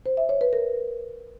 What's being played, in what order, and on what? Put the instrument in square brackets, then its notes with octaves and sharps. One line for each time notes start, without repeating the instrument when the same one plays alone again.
[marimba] C5
E5
C#5
B4
A#4